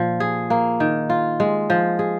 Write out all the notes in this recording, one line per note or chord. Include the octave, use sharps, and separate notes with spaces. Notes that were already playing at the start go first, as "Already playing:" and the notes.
Already playing: A#2 F3
G#4
A#3
D#3
F4
G#3
F3
G#4